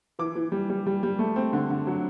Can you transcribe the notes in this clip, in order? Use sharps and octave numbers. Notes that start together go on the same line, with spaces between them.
E3 D6
E3
G3
G3
G3
G3
A3
C4
D3
D3
F#3